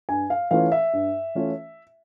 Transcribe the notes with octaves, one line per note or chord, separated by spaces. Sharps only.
G2 G#5
F5
E3 A3 C#4 F4 F5
E5
G2
E3 A3 C#4 F4